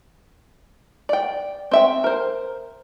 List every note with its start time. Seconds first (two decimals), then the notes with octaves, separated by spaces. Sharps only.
1.09 D5 G5
1.71 C4 E5 G5
2.04 A#4 C5